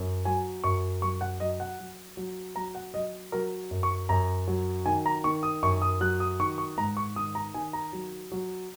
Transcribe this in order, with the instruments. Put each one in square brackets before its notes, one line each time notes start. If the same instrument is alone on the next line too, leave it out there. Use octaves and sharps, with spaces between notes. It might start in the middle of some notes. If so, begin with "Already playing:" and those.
Already playing: [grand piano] F#2
F#3 G#5
F#2 C#6
F#3 C#6
F#5
F#3 D#5
F#5
F#3
F#3
F#3 A#5
F#5
F#3 D#5
F#3 A#4
F#2
C#6
F#2 A#5
F#3
D#3 G#5
A#5
D#3 C#6
D#6
F#2 C#6
D#6
F#3 F#6
D#6
D#3 C#6
C#6
G#2 A#5
C#6
D#3 D#6
A#5
D#3 G#5
A#5
F#3
F#3